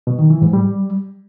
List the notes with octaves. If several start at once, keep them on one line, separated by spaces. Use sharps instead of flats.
B2
D#3
E3
G#2
G3